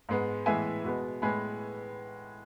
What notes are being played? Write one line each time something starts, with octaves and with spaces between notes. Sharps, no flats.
G#2 G#3 B3
A2 E3 G#3 B3 E5 G#5
B2 G#3 B3
A2 G#3 B3 G#5 B5